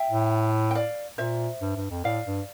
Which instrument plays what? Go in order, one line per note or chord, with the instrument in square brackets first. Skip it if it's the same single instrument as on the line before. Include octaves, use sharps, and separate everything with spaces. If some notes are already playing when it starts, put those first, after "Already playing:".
Already playing: [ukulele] E5 G5
[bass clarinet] A2
[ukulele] G5
D5 F5
[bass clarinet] A#2 [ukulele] C5 E5
[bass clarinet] G2
G2
F2
[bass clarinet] A2 [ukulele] D5 F5
[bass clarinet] G2